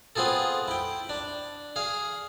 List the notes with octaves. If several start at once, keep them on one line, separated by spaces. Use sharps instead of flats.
B3 C4 F4 G#4 A4
E4 G5
D4
G#4 F5